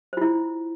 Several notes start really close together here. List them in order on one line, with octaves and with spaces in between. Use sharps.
C5 F4 E4